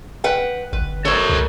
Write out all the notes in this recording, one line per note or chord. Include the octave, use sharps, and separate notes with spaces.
B4 F#5 G5
G1 B4
A4 A#4 C5 C#5
C#2